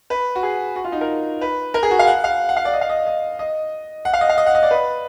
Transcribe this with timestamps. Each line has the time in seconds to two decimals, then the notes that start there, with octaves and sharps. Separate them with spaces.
0.10 B4
0.35 F#4
0.43 G#4
0.76 F#4
0.84 F4
0.92 D#4
1.01 A#4
1.41 B4
1.74 A#4
1.83 G#4
1.91 F#4
1.99 F5
2.07 F#5
2.24 F5
2.49 F#5
2.56 F5
2.65 D5
2.73 D#5
2.81 F5
2.90 D#5
3.07 D#5
3.39 D#5
4.05 F#5
4.13 F5
4.21 D#5
4.29 F5
4.38 D#5
4.46 F#5
4.55 D#5
4.63 D5
4.71 B4